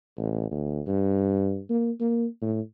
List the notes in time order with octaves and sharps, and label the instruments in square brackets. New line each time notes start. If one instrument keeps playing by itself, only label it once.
[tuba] A1
D2
G2
A#3
A#3
A2